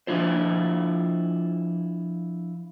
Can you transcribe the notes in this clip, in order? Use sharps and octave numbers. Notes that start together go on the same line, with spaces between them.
F3 D4 E4 F4 C5